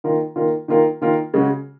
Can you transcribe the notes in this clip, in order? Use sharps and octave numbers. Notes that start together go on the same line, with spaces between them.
D#3 A#3 F4 A#4
D#3 A#3 F4 A#4
D#3 A#3 F4 A#4
D#3 A#3 F4 A#4
C#3 G#3 C#4 F#4